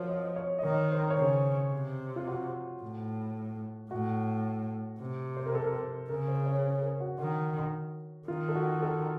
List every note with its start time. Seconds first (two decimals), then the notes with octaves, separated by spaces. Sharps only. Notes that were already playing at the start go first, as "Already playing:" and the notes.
Already playing: F3 F#4 A#4 C5 C#5
0.09 D#5
0.36 C#5
0.58 D#5
0.63 D#3 C#5
0.92 C5
1.10 C#5
1.18 C#3 C5
1.73 C3
2.16 F4
2.28 F#4
2.82 A2
3.91 A2 F#4
5.01 C3
5.37 C5
5.46 A#4
5.55 A4
5.64 A#4
6.09 C#3 A#4
6.28 C5
6.46 C#5
6.64 C5
6.82 A#4
7.01 F#4
7.19 D#3 F#4
8.28 D#3 F4
8.49 A4
8.55 F#4
8.82 A4